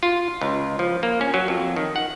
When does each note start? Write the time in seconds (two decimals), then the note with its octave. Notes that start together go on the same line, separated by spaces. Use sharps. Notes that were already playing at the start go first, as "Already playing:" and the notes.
0.03 F4
0.41 C#2
0.79 F3
1.03 A#3
1.21 C#4
1.34 F#3
1.48 F2
1.76 D#3
1.96 F#5